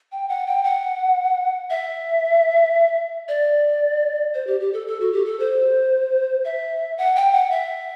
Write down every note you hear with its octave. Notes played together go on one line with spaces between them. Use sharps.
G5
F#5
G5
F#5
E5
D5
C5
G4
G4
A4
A4
F#4
G4
A4
C5
E5
F#5
G5
F#5
E5